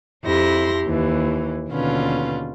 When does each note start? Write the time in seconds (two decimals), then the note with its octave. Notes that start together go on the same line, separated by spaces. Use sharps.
0.24 F2 E4 G4 C6 A#6
0.86 D#2 E3
1.70 D#2 B2 D3 C#4 F4 B4